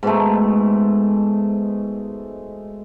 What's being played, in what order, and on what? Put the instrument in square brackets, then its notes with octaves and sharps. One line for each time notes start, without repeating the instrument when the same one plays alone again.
[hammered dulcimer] G#2 B2 G#3 A3